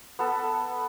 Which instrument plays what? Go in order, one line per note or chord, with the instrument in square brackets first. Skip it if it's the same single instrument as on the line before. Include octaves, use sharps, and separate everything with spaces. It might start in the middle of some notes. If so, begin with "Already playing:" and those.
[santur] B3 A4